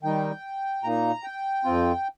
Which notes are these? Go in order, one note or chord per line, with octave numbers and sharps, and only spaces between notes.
D#3 G3 D#4 G5
A#2 A#3 D#4 A#5
G5
F2 F3 C4 F4